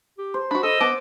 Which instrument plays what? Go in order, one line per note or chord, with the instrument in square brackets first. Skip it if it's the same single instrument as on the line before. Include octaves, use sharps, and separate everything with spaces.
[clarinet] G4
[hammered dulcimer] C5
[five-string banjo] D4 F#4 [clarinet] B5
[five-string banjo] A4 [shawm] D#5 [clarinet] E6
[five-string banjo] B3 A5 [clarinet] D6